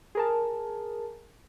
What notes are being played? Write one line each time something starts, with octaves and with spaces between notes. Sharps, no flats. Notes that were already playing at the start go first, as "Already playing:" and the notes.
G#4 A#4 A5